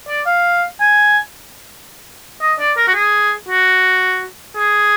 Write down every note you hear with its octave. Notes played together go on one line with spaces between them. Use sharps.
D5
F5
G#5
D#5
D5
A#4
F#4
G#4
F#4
G#4